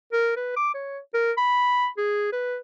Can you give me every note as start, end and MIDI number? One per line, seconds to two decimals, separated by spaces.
0.13 0.32 70
0.36 0.56 71
0.56 0.72 86
0.74 0.98 73
1.14 1.32 70
1.37 1.88 83
1.97 2.30 68
2.32 2.57 71